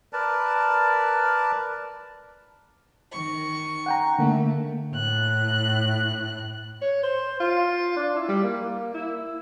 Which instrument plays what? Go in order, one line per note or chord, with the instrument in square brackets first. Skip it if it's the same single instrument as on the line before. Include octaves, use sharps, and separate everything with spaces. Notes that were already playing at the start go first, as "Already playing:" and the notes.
[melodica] A#4 B4 D5 A5
[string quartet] D#3 C#6
[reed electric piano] F#5 G5 A#5
[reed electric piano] D3 A#3 [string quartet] A3
[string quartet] A2 F#6
[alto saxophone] C#5
C5
F4
D4
E4
G3
A#3
E4